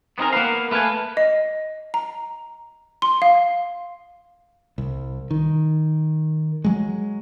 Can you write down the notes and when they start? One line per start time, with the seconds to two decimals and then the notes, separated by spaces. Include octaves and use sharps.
0.18 B3 C4 D#4 G#4 A#4
0.33 A#3 B3 B4 F5
0.71 A3 B4 F5 G5 G#5
1.17 D#5
1.94 A#5
3.02 C6
3.22 F5
4.78 C2
5.31 D#3
6.64 F#3 G#3